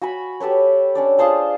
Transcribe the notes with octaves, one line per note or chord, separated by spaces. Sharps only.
F#4 G#5 B5
G4 A4 B4 C#5
C#4 D4 D5
F4 G#4 C5 A5